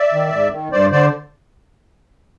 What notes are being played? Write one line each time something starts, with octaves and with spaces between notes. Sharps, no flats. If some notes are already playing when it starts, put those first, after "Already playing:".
Already playing: D5 E5
D#3
G#2
D#3
G2 C5 D5
D3 C5 D5